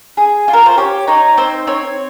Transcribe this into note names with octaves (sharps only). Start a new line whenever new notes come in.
G#4
F4
A#4
C5
G4 C#5
D#4 C#5
C4 C5
C4 C#5